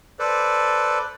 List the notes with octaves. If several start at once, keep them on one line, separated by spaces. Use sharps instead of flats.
A4 B4 C5 D5